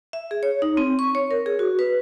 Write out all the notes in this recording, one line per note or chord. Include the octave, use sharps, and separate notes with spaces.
E5
G#4
C#5
D#4
C4
C#6
C#5
A#4
G#4
F#4
B4